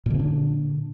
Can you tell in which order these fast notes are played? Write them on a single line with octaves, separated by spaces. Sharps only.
A#2 D3 C#4 D4